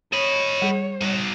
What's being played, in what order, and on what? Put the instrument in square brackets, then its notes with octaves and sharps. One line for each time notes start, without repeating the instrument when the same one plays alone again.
[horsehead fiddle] C#5 [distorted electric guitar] D#5 B5
[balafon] G3 G#4
[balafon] G3 [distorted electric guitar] D#4 F#4